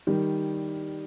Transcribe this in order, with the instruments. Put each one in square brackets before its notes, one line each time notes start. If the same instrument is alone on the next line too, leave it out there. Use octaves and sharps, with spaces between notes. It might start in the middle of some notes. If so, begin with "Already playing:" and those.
[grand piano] D#3 G3